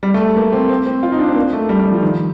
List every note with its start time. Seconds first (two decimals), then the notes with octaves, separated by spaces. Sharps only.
0.03 G3
0.14 A3
0.37 A#3
0.52 C4
0.69 C4
0.86 C4
1.03 F4
1.12 D#4
1.19 D4
1.28 C4
1.36 A#3
1.53 A3
1.69 G3
1.80 G3
1.92 F3
2.02 D#3